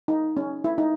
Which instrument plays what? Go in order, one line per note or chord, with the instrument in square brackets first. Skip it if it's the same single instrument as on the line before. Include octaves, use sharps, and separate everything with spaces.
[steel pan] D#4
C#4
E4
D#4